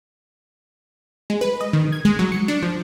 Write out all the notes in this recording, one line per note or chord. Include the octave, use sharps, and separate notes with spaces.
G#3
B4
D#5
D#3
G#6
G#3
F#3
C#7
D4
F3